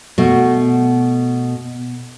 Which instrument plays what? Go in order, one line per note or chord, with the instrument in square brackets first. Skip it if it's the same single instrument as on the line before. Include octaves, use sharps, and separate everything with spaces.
[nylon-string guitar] B2 A3